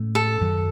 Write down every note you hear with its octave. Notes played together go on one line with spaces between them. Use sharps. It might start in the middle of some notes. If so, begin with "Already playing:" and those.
Already playing: A2 A3 C#4
A4
F#2 D#3 F#3